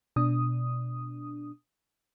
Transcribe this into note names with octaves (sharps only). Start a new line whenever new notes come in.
B2 D4 D#6